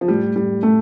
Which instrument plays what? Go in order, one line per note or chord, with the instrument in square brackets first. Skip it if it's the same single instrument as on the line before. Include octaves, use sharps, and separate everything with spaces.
[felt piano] F3
[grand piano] A2 [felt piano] G3
[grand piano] A2 [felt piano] G3
[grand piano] A2 [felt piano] A3